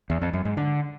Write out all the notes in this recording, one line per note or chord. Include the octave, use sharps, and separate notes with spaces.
E2
F2
F#2
G#2
D3